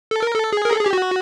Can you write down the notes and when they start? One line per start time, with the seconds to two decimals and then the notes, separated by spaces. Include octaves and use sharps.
0.11 A4
0.23 A#4
0.35 A4
0.53 G#4
0.65 A#4
0.73 A4
0.80 G#4
0.86 G4
0.93 F#4